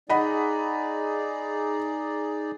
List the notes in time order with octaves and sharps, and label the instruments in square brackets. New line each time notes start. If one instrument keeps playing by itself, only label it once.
[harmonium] D#4 G#4 D5 [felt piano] D#5 F#5 B5